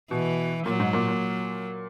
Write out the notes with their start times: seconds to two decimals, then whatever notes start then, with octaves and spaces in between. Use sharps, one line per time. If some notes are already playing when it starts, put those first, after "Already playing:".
0.10 B2 E3
0.66 A#2 F#3
0.80 G#2
0.93 A#2
1.07 A#2